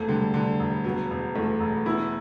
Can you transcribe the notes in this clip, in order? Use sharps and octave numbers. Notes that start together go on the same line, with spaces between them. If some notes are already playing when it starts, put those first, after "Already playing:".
Already playing: E1 A3
D3 G3
D3
E1
F#3 B3
E1
E2 A3
E1
B3 E4